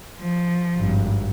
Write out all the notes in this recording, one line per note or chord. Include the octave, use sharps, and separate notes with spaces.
F3
G#1 G2